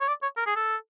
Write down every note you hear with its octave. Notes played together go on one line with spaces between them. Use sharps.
C#5
D5
C#5
A#4
G#4
A4